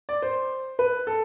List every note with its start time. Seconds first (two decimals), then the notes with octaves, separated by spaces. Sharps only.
0.09 D5
0.22 C5
0.79 B4
1.07 A4